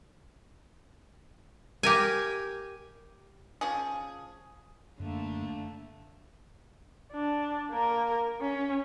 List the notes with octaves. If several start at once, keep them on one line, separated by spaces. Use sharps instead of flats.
G4 A#4 G#5
F3 C#4 G#4
F#2 D3 A3 A#3
D4
A#3 A#4
C#4